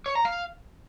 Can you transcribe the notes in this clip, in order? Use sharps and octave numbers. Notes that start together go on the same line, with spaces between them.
C#5
A#5
F5